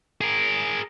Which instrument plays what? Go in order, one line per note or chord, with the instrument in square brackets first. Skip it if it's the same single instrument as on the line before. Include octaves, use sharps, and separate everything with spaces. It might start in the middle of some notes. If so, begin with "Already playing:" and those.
[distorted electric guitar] G#4 A#4